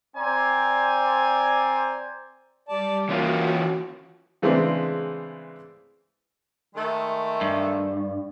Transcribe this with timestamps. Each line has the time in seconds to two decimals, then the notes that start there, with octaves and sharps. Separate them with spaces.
0.16 C4 C5 D5 G#5 A#5
2.69 G3 D5 A5
3.09 E3 A#3 C#4 F4 F#4
4.42 C#3 E3 G#3 A3 C4 D4
6.75 D#3 G#3 A3
7.41 G2